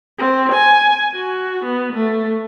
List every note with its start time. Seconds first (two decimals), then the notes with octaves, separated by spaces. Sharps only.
0.18 C4
0.52 G#5
1.14 F#4
1.65 B3
1.93 A3